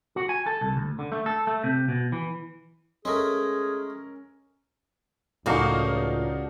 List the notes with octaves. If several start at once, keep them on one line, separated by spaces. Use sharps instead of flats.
F#4
G#5
A4
C2
D2
D3
A3
A4
A3
C3
B2
E3
G#3 A3 C#4 G#4 A#4
C#2 A2 F3 A#3 D4 D#4 F#4 F5